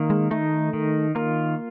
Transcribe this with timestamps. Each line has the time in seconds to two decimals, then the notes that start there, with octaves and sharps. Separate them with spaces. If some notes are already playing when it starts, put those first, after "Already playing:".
Already playing: D#3 A#3
0.10 G#3
0.31 A3 D#4
0.73 D#3
1.15 A#3 F4